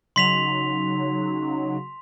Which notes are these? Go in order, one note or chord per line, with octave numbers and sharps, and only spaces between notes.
C#3 F#3 D#4 C6 B6 F7